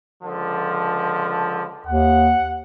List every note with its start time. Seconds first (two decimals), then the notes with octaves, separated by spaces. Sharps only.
0.23 C#2 D3 F3
1.87 D#2 F#5